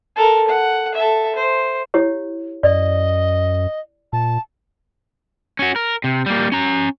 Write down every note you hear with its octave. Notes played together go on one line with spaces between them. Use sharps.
A4 A#4
F#5
A4 E5
C5
E4 G4 C#5
F#2 D5 D#5
A#2 A5
C#4 F#4
A#4
C3
G3 A#3
C#4 A#5